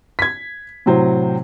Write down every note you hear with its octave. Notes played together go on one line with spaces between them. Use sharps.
G#6 B6
A2 C3 F#3 C5